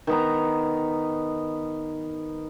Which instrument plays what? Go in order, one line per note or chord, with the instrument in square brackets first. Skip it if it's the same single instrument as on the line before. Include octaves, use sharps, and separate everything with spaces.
[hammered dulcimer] D#3 B3 A#5